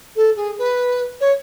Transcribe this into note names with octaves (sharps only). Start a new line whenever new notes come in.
A4
G#4
B4
C#5